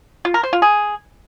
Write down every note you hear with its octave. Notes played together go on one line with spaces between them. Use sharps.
F4
A#4
C5
F4
G#4